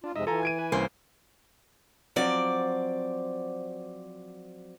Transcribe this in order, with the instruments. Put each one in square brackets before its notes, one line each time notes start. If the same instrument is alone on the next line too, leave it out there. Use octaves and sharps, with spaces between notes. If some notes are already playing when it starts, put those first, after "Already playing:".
[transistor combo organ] D4 [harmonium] F4
[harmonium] F2 C3 G#3 [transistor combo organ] D#4 D#5 E5
[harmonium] E3 [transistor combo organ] F4 G#5 [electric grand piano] A4 A#5
[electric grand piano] G#6 D7 D#7
[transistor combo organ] B4 G#5
[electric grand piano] C2 [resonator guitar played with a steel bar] A#3 C#4 C5
[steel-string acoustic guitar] F3 F#3 C4 D5